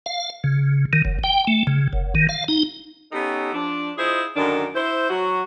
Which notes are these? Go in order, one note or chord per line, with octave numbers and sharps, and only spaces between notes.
F5
C#3
D#3
F#1
G5
A3
C#3
F#1
D#3
F5
D#4
B3 C#4 D#4 G4 A4
F3 D4
E4 F4 G#4 C5 D#5
F#2 D3 D#3 D4 D#4
E4 C5
F#3 F#4